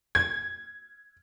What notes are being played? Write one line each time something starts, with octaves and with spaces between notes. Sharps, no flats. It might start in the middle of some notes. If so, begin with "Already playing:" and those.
G#6